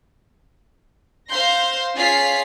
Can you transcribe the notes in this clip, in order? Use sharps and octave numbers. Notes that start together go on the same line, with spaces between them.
C5 F5 C6 G6 A#6
C#4 F4 G#4 F5 B6 C7